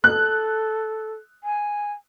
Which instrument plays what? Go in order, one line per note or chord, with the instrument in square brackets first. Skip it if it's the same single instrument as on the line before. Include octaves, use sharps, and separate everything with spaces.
[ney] A4 [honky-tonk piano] F#6
[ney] G#5